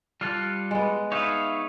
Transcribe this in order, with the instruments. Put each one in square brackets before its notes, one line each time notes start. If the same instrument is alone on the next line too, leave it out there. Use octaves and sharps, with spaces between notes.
[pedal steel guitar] G3 F6 F#6 [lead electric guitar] F4 A4
[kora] G#3 B3
[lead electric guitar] D#4 B4 [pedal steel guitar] C#5 E5 F5